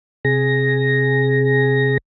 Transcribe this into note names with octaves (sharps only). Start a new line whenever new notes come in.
C3 G#4 A#6